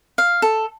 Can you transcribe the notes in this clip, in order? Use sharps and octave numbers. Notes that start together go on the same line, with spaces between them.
F5
A4